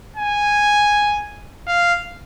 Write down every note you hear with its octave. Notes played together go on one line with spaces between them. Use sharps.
G#5
F5